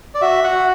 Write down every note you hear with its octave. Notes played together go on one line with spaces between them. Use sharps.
D5
F#4 E5
F#4 F#5